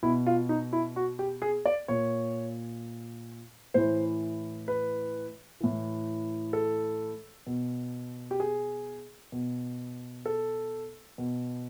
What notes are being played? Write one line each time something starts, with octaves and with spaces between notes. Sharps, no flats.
B2 E4
F4
D#4
E4
F#4
G4
G#4
D5
A#2 C#5
A2 E3 C5
B4
A2 E3
A4
B2
G4
G#4
B2
A4
B2